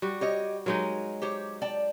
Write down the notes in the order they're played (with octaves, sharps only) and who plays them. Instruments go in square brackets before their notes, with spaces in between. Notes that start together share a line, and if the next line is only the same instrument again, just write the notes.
[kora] G3 F#4
[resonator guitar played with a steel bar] G4 C#5 D#5
[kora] F#3 G#3 D#4 [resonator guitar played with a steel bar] A#4
[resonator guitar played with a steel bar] G4 C5 C#5
D5 G5 A5